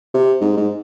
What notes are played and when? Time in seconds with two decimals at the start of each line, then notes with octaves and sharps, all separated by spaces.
0.14 C3
0.41 G#2
0.57 G#2